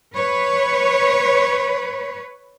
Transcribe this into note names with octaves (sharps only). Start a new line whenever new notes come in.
B4 C#5